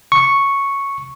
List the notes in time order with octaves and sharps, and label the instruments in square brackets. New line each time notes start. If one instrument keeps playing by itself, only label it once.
[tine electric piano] C#6